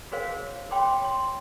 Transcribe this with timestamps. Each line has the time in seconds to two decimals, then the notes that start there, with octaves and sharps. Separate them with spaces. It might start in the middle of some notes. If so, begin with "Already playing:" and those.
0.12 F#4 G#4 A#4 C5 C#5 F5
0.71 C#5 G5 B5 C6 D6
1.04 C6